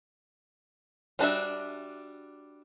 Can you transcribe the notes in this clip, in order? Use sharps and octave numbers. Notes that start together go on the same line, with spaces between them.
G3 D4 F#4 E5